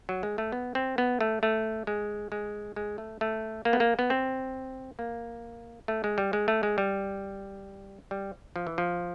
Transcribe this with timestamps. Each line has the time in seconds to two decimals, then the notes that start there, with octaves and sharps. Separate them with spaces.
0.09 F#3
0.23 G#3
0.38 A3
0.52 B3
0.75 C4
0.98 B3
1.21 A3
1.43 A3
1.87 G#3
2.32 G#3
2.76 G#3
2.98 A3
3.21 A3
3.65 A#3
3.73 B3
3.80 A#3
3.99 B3
4.10 C4
4.99 A#3
5.88 A3
6.04 G#3
6.18 G3
6.33 G#3
6.48 A3
6.63 G#3
6.78 G3
8.11 G3
8.56 F3
8.67 E3
8.78 F3